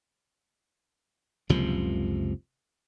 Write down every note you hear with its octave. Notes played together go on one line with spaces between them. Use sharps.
F#1 C#2 C3 F3